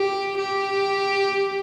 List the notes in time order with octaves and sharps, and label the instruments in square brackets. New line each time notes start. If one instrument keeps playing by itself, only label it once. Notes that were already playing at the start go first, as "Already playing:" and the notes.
Already playing: [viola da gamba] G4
G4